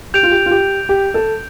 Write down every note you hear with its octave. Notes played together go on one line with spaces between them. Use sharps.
G4 G6 D7 F7
F4
G4
F4
G4
G4
A4